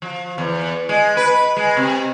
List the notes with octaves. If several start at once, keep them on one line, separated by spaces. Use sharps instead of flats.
F3
E2
G#3
B4
G#3
C3